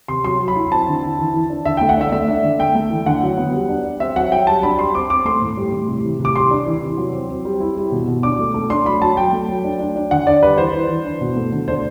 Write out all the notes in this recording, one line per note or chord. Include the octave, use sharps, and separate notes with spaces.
C3 C6
F#3 C6
F#3
B5
E4
C4 A5
D3
E4
E3
E3
D4
D3 E5
A3 G5
F#5
D4 E5
A3 E5
D4
D3
A3 G5
A3
E3
D3 F#5
F#3
B3
G3
D4
G3
C4 E5
F#3 F#5
F#3 G5
G3 A5
D4 B5
G3 C6
C4 D6
C4 D6
A3 C6
A2
G3
A2
C3
E3
C3
D6
G3 C6
D4
E3
C3
F#3
C4
C4
G3
E4
G3
B2
B2
D4 D6
A3
A3
D4 C6
F#3 B5
F#3 A5
F#3 G5
A3
F#3
D4
D4
D4
D3 F#5
D4 D5
G3 B4
E3 C5
E3
E3
D4
B2
A3
D3
D4 C5